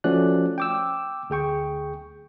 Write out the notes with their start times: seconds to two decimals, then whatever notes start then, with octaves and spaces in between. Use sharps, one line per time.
0.04 F3 A3 C#4 F#4 D5 F#6
0.58 G5 D6 E6
1.30 D2 G#4 G5 C#6